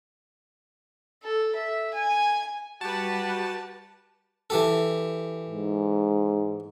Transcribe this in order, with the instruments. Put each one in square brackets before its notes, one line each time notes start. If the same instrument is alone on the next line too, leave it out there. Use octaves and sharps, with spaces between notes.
[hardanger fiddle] A4
E5
G#5
[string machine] G3 [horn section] F#4 [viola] G4 B4 [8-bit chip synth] A5
[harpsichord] E3 G4 A4
[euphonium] G#2